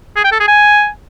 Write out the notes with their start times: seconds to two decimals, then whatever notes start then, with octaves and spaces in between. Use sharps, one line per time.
0.16 G#4
0.24 G5
0.32 A4
0.40 G#4
0.48 G#5